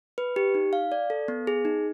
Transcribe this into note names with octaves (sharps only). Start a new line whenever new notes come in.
B4
G4
D#4
F5
D5
A4
B3
G#4
D#4